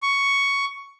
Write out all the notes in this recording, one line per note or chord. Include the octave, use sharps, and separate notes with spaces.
C#6